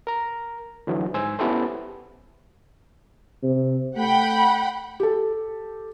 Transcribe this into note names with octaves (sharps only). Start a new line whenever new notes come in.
A#4 A#5
D3 E3 F#3
G#2 C5 G#5 E6
B3 C#4 E4 G4 A4 C5
C3
A3 F#5 G5 B5
G4 A4